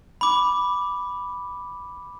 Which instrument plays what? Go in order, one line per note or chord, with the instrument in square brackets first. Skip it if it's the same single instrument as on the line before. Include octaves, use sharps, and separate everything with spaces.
[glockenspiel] B5 D6